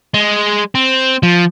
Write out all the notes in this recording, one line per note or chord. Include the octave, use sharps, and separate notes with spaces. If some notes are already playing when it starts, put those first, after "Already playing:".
G#3
C4
F3